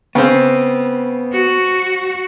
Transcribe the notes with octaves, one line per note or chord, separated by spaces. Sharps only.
C#3 B3 C4
F#4